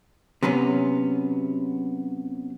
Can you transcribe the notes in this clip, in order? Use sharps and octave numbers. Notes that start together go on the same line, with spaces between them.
C3 F#3 B3 C#4